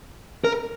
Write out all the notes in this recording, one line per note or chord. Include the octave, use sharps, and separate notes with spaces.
A#4